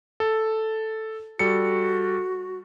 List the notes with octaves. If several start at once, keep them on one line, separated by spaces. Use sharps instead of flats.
A4
G3 F#4 A4 C#7